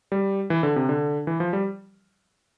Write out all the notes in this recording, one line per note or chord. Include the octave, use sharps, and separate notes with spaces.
G3
E3
D3
C3
D3
E3
F3
G3